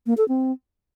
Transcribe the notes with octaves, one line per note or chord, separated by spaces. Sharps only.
A#3
A4
C4